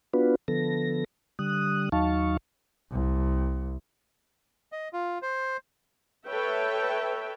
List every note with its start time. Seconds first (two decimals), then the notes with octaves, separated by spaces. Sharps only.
0.13 B3 D4 F4 F#4 B4
0.48 D3 F3 B3 A4 A#6
1.39 D3 G3 D#6 F#6
1.92 D#2 F#3 D#4 F5 A5 C#6
2.92 C2
4.72 D#5
4.93 F4
5.22 C5
6.27 A4 B4 C#5 E5 G5